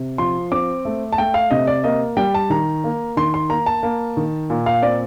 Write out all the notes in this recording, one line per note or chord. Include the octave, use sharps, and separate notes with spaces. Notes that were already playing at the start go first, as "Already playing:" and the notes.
Already playing: C3
F3 C6
C4 D6
A3
A5
A3 G5
F5
C3 D#5
D5
A#3 D#5
G3 G5
A5
D#3 A#5
A#3
D#3 C6
C6
A#3 A#5
A5
A#3
D#3
A#2
F5
C4 D5